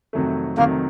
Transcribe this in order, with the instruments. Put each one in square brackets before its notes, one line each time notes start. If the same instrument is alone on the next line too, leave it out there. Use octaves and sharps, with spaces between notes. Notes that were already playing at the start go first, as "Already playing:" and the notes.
[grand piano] F2 C3 D#3 F#3 A3
[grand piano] F2 C3 D#3 F#3 A3 [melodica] A#3